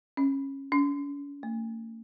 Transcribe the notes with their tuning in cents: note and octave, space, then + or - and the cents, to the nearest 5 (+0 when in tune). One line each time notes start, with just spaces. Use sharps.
C#4 -20
C#4 +40
A3 +45